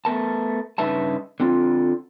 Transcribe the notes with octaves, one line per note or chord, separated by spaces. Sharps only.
A3 B3 A#4 A5
G2 C#3 D#4 B4 E5 A5
D3 C4 F4